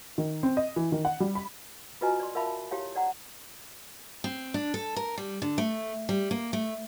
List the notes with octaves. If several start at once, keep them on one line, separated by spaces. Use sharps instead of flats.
D#3
C4
D#5
E3
D#3
F#5
G3
B5
F4 F#4 B4 D#5 G#5 A#5
D5 C6
F4 A#4 E5 F5 A5 B5
E4 G4 C#5 F5
D5 F#5 A#5
C4
D4
A4
A#4
G3
D3
A3
G3
A#3
A3